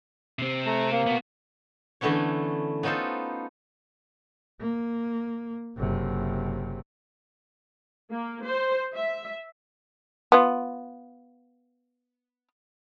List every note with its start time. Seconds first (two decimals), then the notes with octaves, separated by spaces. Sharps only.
0.39 C3 C4
0.66 A3 A#5
0.92 A#3
1.07 B3 F#4
2.01 D3 E3 A3 B3 C#4 C#5
2.83 B3 C#4 D#4 F4 A4 C5
4.61 A#3
5.77 F#1 C3
8.11 A#3
8.45 C5
8.94 E5
10.32 B3 F4